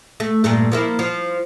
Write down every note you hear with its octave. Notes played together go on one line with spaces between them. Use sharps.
A3
G2 A#2 A3
F3 A#3 E4
F3